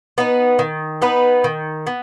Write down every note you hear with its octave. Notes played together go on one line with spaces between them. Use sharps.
B3 D#4 B4
D#3
B3 D#4 B4
D#3
B3